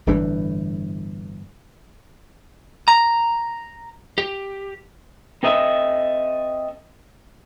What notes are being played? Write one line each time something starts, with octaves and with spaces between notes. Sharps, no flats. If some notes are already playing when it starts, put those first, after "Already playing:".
G1 A2 E3 D4
A#5
G4
C4 A4 D#5 E5